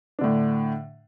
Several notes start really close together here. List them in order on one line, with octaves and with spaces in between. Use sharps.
D4 D3 A2